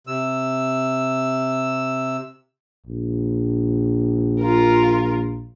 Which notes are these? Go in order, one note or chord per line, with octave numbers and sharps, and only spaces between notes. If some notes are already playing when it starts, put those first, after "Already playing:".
C3 E6
A#1
F4 A#4